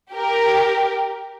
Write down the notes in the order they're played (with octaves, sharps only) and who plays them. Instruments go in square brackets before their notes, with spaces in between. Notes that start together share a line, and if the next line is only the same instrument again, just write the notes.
[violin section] G4 A#4